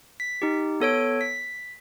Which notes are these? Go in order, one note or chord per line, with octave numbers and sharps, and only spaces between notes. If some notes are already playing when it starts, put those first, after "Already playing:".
B6
D#4 G4
B3 A4 C#5 D7
B6